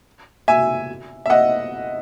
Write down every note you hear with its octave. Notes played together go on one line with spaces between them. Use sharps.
E5 G#5
E5
D#5 F#5